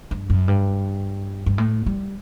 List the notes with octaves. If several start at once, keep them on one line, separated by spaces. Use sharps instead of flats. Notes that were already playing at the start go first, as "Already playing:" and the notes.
G2
F#2
G2
G2
A2
G3